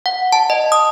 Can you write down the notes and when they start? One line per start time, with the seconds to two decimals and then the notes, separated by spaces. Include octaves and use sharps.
0.06 F#5
0.32 A5
0.50 D#5
0.72 D#6